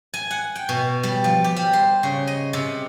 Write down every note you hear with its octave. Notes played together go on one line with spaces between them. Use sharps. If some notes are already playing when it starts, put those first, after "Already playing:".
G#5
F#5
G5
B2
G3
F3
G4
G3
C5
C#3
D#5
C3